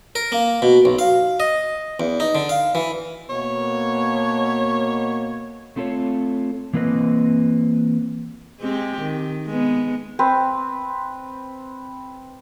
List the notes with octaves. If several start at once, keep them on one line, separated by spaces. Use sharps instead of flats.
A#4
A#3
B2
B1
F5
D#5
E2
D#4
D3
F5
E3
B2 A#3 C#5
A3 C4 F4 A4 B4 C#5
E3 A#3 C4 B4 D#5
G#3 C4 G4
D#3
G#3 B3
C4 B4